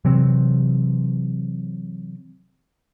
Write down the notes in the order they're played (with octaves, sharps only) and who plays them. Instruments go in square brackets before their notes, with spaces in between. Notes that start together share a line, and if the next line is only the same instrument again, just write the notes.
[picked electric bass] C3 E3 F#3 C4